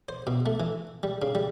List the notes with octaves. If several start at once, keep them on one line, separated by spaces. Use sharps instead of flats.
C5
B2
A3
E3
G3
C#3
G3